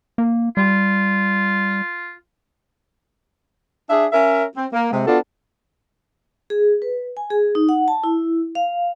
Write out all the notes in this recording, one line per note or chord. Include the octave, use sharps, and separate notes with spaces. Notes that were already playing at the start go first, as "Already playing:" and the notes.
A#3
G3 F4
D4 G#4 E5
C#4 A#4 E5
C4
A#3
C3 G#3
B3 D4 F4 F#4 A4
G#4
B4
G#5
G#4
D#4
F#5
A5
E4
F5